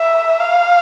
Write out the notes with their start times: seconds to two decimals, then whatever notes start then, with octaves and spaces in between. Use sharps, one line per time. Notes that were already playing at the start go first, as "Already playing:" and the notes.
Already playing: E5
0.40 F5